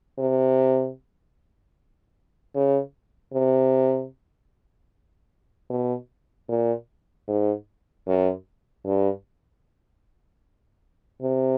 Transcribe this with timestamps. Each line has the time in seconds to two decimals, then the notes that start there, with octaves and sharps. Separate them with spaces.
0.18 C3
2.55 C#3
3.34 C3
5.70 B2
6.49 A#2
7.28 G#2
8.07 F#2
8.85 G2
11.22 C3